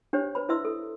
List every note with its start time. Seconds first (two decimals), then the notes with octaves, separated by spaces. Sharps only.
0.13 D4 G4 C5 C#5
0.35 B4 C5 B5
0.49 E4 B4 C5 E5 C6 E6
0.65 A4